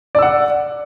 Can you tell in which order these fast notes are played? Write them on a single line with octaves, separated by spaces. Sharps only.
D5 E6 F#5